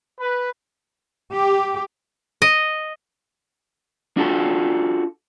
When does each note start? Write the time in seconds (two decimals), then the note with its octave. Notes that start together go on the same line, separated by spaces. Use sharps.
0.20 B4
1.33 G4
2.42 D#5
4.17 D4 F4 F#4 A4